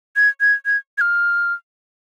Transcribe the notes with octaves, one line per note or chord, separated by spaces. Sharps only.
G#6
G#6
G#6
G#6
F6